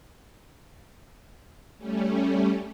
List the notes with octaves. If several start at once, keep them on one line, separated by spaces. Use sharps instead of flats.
G3 A3 C#4